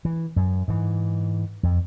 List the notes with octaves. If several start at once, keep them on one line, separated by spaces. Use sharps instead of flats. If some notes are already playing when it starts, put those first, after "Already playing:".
E3
F#2
G#2 E3
F2